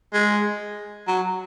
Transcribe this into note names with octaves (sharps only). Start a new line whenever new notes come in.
G#3
F#3